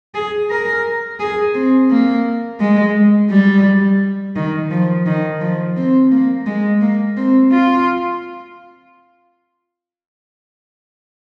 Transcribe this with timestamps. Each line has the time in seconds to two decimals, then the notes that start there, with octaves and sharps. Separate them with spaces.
0.14 G#4
0.50 A#4
1.20 G#4
1.55 C4
1.91 A#3
2.61 G#3
3.30 G3
4.36 D#3
4.71 F3
5.06 D#3
5.41 F3
5.77 C4
6.12 A#3
6.46 G#3
6.82 A#3
7.17 C4
7.52 F4